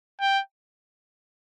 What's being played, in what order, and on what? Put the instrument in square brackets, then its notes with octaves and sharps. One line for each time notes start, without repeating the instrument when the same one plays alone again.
[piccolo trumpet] G5